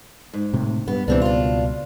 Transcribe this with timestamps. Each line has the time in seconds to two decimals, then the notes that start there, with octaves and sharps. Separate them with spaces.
0.33 G#2
0.54 A2 C3
0.88 G2 B3
1.08 C#2 B2 E3 G3 C4 D4
1.22 D4 F4